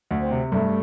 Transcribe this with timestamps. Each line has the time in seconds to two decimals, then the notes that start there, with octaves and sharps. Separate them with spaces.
0.11 D2
0.21 C4
0.31 C3
0.52 G2 A3